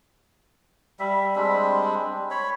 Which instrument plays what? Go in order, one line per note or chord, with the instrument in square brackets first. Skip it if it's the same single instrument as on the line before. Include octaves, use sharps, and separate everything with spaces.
[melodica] G3 E5
G3 G#3 C4 D4
C#5 B5